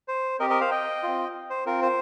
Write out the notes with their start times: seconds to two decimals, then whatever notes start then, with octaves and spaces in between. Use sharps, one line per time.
0.08 C5
0.40 C4 G4 A#4 D#5
0.50 A#4 D#5
0.61 C5 F5
0.71 D#5 G5
1.03 C4 F4
1.50 C5
1.66 C4 F4 A#4
1.82 C5